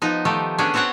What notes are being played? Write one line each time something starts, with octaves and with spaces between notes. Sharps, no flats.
F3 B3 D#4
D#3 F3 A3 G4
B3 C#4 D4 G#4
B3 C4 F#4 C#5 F#5 G5